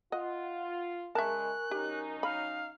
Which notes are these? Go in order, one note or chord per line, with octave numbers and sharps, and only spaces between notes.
F4 D#5 F#5
C#3 G#3 A#4 E5 G#5 A5 C#6 F#6
F#3 C#4 D#4 G4
F5 B5